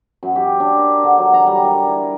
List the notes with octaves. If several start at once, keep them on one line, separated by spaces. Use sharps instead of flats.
F#2
G4
D4
A#4
D3
F#3
A#5
G3
A#4
E4
D6